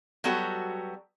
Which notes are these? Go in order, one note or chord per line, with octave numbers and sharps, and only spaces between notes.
F#3 G3 B3 F#4 A4